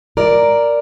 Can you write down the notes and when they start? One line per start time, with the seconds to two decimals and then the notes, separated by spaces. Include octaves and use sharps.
0.17 G#2 A#4 D5